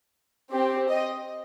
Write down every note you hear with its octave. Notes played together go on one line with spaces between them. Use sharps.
C4 G4
D#5